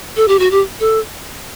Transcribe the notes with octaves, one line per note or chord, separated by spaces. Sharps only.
A4
G4
F#4
G4
A4